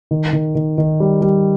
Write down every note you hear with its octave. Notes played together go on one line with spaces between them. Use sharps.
D#3
D#3
D#3
D#3
G3
G3